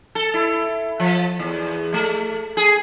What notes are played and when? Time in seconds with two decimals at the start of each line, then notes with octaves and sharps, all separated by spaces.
0.15 A4
0.34 E4
1.00 F3
1.39 E2
1.94 A3
2.57 G#4